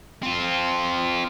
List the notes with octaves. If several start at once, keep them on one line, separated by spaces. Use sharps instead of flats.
C4 F4